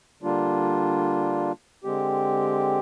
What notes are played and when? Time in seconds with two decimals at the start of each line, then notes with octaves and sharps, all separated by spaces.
0.22 D3 G3 A#3 D4 F4
1.84 D3 G#3 C4 G4